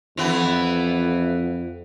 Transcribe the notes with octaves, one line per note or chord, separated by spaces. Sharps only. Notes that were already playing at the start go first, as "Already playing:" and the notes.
F2 E3 B3